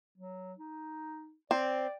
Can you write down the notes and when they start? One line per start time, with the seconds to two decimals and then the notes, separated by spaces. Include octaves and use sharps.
0.18 F#3
0.58 D#4
1.51 C4 D5